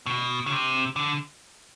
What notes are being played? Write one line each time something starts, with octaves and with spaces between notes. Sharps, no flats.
B2
C#3
C3
D3